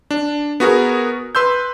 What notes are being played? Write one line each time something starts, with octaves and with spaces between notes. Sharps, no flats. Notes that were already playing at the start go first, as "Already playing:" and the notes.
D4
B3 F#4 G#4 A#4
B4 C6 E6 G6